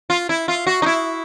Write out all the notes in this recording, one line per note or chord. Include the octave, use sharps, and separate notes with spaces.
F4
E4
F4
F#4
D#4
E4